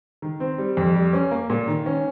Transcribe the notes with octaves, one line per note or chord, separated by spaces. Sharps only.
D#3
C4
G3
F2
G3
C#4
A#3
A#2
D#3
C#4